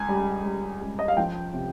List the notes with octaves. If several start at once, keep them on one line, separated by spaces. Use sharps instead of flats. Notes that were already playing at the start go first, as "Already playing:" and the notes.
Already playing: C#2 G#5
G3
G3
C#2
D#5
F5
F3 G5
C3